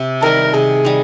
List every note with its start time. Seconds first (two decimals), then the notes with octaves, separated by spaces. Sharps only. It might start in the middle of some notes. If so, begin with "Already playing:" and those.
Already playing: C3
0.22 D#3 G3 A#4
0.54 C3 G#4
0.85 D#3 G3